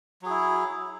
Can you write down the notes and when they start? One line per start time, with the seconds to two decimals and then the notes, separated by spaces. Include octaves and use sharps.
0.22 F#3
0.26 G#4
0.30 E4